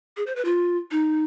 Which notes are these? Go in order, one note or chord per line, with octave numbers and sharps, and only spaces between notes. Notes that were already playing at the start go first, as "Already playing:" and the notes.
G#4
C5
B4
F4
D#4